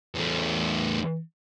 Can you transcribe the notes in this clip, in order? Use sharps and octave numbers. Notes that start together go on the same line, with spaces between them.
E2 A3